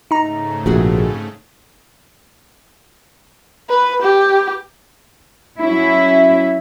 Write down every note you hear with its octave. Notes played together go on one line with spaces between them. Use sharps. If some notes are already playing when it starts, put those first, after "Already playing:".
G#2 C#3 A3 D#4 A#5
A#1 C3 F#4 G#4
B4
G4
F#3 C#4 E4 E5